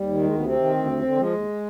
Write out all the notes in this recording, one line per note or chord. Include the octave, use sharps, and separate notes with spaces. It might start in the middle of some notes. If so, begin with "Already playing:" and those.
Already playing: D#2 G3
D#3
D2 G#3
C3 B3
C4
D#3
D2
D#2
D3
F3 G#3
D#2